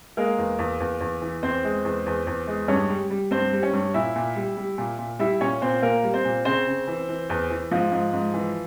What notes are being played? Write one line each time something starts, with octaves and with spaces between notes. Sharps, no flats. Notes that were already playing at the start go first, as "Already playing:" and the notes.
G#3 A#3 A#4
E2
E2
E2
E2
E3
E2 C4 C5
G#3
E2
E2
E2
G#3
G2 C#4 C#5
G3
G3
G2 C4 C5
G3
C#4 C#5
G2
A#2 E4 E5
A#2
G3
G3
A#2
A#2
G3 E4 E5
A#2 C#4 C#5
A#2 C4 C5
A#2 A#3 A#4
G3
C4 C5
A#2
C#3 C4 C5
C#3
E3
E3
E2
E3
G#2 F3 F4
G#2
G#2
E3